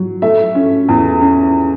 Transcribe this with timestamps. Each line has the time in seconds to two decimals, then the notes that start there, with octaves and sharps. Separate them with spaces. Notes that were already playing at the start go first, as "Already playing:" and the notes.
Already playing: F#3
0.22 A3 E5
0.55 C#4
0.88 E2
1.21 C#4